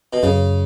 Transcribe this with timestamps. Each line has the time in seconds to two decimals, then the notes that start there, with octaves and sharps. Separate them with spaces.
0.13 B2
0.23 F#2 C#3